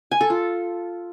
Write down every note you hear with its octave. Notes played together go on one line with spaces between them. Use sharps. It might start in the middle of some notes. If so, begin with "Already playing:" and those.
G#5
A4
F4